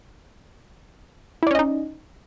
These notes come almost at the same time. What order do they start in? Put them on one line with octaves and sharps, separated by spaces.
E4 D5 C#4 D#5 D#4